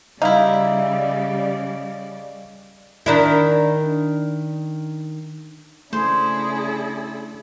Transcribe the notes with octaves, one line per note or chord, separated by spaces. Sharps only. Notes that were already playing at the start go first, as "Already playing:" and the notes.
C#3 G3 D#4 E4 D5 D#5 F5
D#3 D4 E4
C#3 A3 D4 E4 G#4 C5